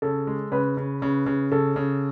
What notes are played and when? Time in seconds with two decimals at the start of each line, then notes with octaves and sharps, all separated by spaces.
0.02 C#3 A4
0.27 G#3
0.52 C#3 B4
0.77 C#3
1.02 C#3
1.26 C#3
1.52 C#3 A4
1.76 C#3